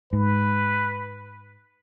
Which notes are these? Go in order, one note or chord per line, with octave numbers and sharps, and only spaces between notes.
G#2 B4